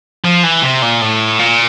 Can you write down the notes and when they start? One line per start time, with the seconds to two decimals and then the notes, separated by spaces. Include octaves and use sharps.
0.25 F3
0.43 E3
0.63 C3
0.82 A#2
1.01 A2
1.39 A#2